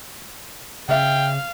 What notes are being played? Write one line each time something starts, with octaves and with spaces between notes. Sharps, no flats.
C#3 D5 E5 F5 G5